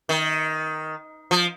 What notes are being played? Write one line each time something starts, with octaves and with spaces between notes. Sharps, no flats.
D#3
F3